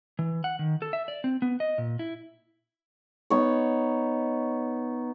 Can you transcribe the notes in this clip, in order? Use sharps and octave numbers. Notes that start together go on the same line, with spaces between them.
E3
F#5
D#3
A4
E5
D5
C4
B3
D#5
A#2
E4
B3 D#4 C#5